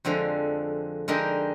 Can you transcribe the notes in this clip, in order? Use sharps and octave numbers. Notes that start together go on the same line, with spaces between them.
F2 D3 F3 G#3
D3 G#3 D#4 G4 A#4